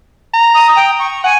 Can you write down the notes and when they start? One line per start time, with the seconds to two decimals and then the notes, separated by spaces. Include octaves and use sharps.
0.34 A#5
0.54 D#6
0.76 G5
0.99 C#6
1.24 F#5 G#5